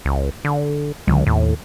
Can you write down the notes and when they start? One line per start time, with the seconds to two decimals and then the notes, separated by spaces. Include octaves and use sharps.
0.05 C#2
0.45 D3
1.07 C#2 D3 F#3 G#3
1.27 D#2 A2